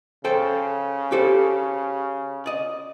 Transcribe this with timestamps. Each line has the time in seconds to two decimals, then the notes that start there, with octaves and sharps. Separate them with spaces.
0.25 C#3 A4 C5 G5
1.12 G4 A4 C5
2.46 D5 D#5